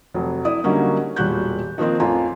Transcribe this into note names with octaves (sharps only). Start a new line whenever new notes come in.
F1 F#3
E4 D5 D#6
D3 F#3 G3 A#3 C#4 D#4
E1 A#2 G3 F#4 F#6 G6
D#3 F3 A#3 C4 D#4
A1 F2 F4 G#5 A#5